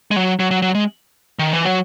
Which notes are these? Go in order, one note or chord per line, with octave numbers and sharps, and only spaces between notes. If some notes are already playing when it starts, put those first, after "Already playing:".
G#3
F#3
F#3
F#3
F#3
G#3
D#3
E3
F#3